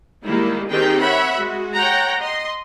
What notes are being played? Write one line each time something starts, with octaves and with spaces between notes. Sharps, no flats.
D#3 G3 G#3 A#3 E4
D#3 C4 D#4 G4 G#4 G5
C#5 E5 F#5 B5
G#3 F#4
C#5 F#5 G5 A#5
D#5 C6